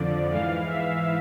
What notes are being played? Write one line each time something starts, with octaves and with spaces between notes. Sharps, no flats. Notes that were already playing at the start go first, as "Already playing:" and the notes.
Already playing: F2 D3 F3 D5
G#2 E3 F5
E5